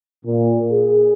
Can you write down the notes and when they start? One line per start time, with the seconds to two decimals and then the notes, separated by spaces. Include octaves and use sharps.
0.24 A#2
0.72 G#4